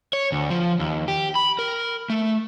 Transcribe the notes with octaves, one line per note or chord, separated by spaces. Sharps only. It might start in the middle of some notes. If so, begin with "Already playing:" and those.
C#5
D2
F3
D#2
G4
B5
A#4
A3